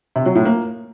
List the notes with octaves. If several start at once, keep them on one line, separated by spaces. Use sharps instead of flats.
C3
F#3
A2
A#3